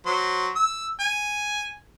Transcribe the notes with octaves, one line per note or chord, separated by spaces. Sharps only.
F#3 C5
E6
G#5